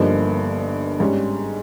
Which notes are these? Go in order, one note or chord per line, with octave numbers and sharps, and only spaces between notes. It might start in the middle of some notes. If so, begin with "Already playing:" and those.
Already playing: G1 G2 F3 A#3 D#4
G#2 G3 C#4